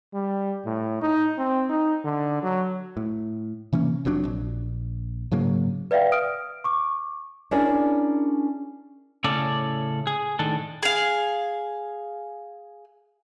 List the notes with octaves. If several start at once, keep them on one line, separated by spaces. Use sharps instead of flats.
G3
A2
D#4
C4
D#4
D3
F#3
A2
C3 E3 A#3 C#4
F1 F2 F#3 D4
A#1
G#2 C#3 F#3 A#3
B4 D5 E5 F5 G5
D#6 F6 D7
C#6 D6
C#4 D4 E4 G#4 A#4 D5
A2 C#3 C#4 A4 D5
G#4
A2 D#3 D4 A4
G#4 F5